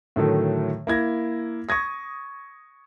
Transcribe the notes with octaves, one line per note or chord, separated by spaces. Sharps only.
A2 D3 D#3 F#3 A3
A#3 E4 G#6 A#6
C#6 D#6 G#6 A#6